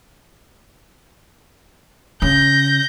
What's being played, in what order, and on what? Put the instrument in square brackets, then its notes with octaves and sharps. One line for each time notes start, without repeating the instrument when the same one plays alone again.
[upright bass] C#3 [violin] G6 A#6